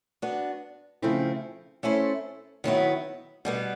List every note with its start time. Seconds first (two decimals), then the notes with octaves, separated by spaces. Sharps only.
0.22 B3 D4 F#4
1.02 C#3 F3 A3 C4 E4
1.83 A3 C#4 E4 A4 C5
2.64 D#3 F#3 B3 E4
3.45 B2 G3 B3